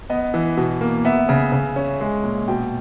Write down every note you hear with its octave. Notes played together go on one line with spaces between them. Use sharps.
B3 D#5
E3
B2
A#3
B3 E5
C#3
C#3
C#4
G#3
A#2
B2 G5